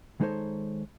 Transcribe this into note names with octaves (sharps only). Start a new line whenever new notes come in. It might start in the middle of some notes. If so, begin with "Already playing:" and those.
D#3 G#3 D#4 A4 C5 C#5